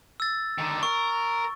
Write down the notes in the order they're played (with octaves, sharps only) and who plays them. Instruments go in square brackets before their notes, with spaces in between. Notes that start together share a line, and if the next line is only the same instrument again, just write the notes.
[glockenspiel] E6 A6
[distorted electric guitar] D3 D#3
[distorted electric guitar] A#4 [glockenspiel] C#6